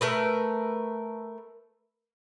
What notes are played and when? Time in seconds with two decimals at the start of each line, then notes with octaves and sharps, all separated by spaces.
0.01 A3 A#4 B4